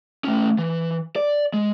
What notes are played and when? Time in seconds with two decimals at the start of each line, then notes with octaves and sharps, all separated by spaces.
0.24 A3 C#4
0.59 E3
1.16 D5
1.54 G#3